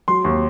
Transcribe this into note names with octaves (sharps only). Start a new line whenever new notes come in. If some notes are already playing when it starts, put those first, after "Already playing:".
F#3 C6
D#2